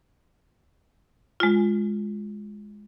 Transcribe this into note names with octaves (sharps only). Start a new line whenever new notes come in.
G#3 F4